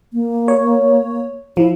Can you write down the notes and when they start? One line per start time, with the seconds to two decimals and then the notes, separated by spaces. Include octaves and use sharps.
0.13 A#3
0.48 C#5
1.57 F3 E4